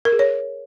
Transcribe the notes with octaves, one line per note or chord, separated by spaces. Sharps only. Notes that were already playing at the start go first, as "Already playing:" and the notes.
A#4
G#4
C#5